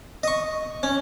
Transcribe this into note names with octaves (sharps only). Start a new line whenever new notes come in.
D#5 C#6
C#4